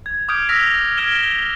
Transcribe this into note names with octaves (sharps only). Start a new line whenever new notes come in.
G#6
D6 D#6 F6 G6 G#6 D7
D6 E6 F6 A#6 B6 F7
F6 G#6 D7 E7 G7